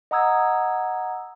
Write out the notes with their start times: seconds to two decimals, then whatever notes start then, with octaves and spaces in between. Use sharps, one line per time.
0.11 D#5 F#5 A#5 D#6 E6 G#6